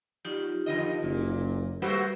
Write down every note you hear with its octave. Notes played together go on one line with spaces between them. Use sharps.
F#3 D#4 F4 G4
F2 D3 D#5
F#1 A#2
G3 G#3 F#4 B4 C5